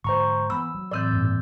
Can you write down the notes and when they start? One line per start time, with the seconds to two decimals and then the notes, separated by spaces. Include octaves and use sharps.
0.04 G#2 D3 F3 C5 A#5 C#6
0.50 E3 B3 B5 E6
0.75 F#3
0.91 A2 E3 C4 D5 E6 G6
1.12 G2 A#2